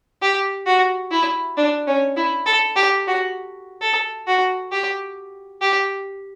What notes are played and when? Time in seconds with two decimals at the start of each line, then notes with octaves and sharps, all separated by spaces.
0.22 G4
0.67 F#4
1.11 E4
1.57 D4
1.87 C#4
2.17 E4
2.46 A4
2.76 G4
3.07 F#4
3.81 A4
4.27 F#4
4.72 G4
5.62 G4